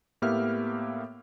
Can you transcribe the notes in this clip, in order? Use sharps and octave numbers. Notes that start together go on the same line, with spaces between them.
A2 A#3 B3 G4 E5 F6